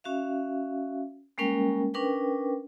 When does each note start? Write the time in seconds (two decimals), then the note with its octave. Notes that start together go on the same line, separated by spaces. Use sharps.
0.04 C#4 F#4 E5 F5
1.38 G3 G#3 A#3 C#4 A#4 G5
1.94 C#4 D4 A#4 B4 G5